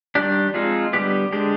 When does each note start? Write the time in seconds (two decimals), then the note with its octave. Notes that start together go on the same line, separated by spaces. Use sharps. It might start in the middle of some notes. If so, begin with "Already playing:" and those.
0.15 D#3 G3 D4 G4
0.54 F3 G#3 C4 D#4 F4
0.93 D3 G3 B3 G4
1.32 D3 G#3 D4 G4